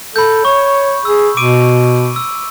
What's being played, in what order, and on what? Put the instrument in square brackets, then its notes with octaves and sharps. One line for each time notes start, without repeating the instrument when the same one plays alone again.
[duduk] A4 [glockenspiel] B5 G6
[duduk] C#5 [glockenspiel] C#6
[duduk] G#4 [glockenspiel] E6
[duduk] B2 [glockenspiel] D6 D7 D#7
[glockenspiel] E6